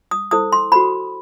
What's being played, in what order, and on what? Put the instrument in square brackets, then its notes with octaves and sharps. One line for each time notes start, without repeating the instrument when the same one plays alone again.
[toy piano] D#6
E4 A4 C5 D#6
C6
F#4 A4 C5 B5